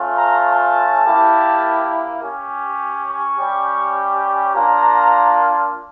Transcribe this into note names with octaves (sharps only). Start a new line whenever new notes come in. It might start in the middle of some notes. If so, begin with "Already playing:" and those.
Already playing: A3 C#4 F4
A#5
A5
A#3 E4 G4
C#4 G4
C#6
G3 C#4 G4
A#3 D4 F4 A#5